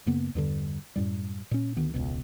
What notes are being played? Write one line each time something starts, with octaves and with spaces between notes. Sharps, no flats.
F#2 C#3 A#3 B3
E2 G2 D3
F#2 A2 G3
A#2 C#4
D2 D#3 B3
E1 C#2 B2